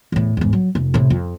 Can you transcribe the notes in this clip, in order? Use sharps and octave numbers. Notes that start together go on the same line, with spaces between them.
E2 A2
E2 G#2
F#3
F1
A2 C3
F2